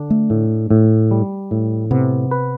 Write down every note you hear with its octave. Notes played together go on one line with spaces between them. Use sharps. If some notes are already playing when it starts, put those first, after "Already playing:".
Already playing: D3 D4
A3
A2
A2
G3
A2
C3 B3
B4